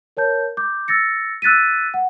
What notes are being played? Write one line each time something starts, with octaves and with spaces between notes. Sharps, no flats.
A#4 C#5 A5 G6
D6 G6
E6 A6 A#6 C#7
E6 F#6 A6 B6 D#7
F#5